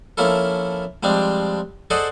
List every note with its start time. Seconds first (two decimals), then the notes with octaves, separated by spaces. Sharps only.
0.17 F3 A#3 C#4 E4 A4
1.03 F3 G3 G#3 C4 D4
1.90 G#4 A4 C5 D5 D#5 F#5